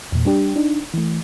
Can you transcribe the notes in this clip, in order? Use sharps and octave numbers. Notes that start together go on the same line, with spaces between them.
E2 A#2
G3 D4 G4
D4 D#4
E3 A3